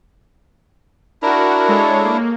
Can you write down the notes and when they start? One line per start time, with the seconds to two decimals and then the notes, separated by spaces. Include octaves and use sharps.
1.22 D4 E4 F#4 A#4
1.69 G#3 A4 C#5
2.04 A#3